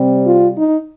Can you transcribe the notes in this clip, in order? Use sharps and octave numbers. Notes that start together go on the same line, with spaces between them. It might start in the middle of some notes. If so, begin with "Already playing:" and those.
Already playing: C3 G3 C4
F4
D#4